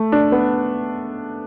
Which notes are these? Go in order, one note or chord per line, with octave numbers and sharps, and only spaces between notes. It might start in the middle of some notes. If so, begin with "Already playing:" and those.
Already playing: A3
D4
B3